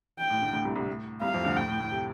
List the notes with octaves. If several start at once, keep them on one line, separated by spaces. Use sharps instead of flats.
G5
A2
D2 D3
D2 D3
C2 C3
C2 C3
A2
C2 C3 F5
F2 F3
D2 D3
A2 G5
A2
A2
C3